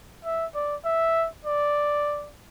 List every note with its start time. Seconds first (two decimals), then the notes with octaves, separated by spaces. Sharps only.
0.25 E5
0.54 D5
0.85 E5
1.45 D5